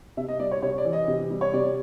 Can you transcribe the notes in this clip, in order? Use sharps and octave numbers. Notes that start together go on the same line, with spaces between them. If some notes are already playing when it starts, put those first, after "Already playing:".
C3 E5
D#5
G3 D5
C#5
C3 C#5
D5
E3
D#5
C3
G3
C#5
C3 D5